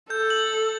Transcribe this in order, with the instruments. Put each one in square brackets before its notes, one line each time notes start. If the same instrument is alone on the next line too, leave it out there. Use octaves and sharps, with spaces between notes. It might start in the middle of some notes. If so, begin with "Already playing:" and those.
[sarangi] A4 [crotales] G6
[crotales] F#7